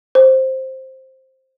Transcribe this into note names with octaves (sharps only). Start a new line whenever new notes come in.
C5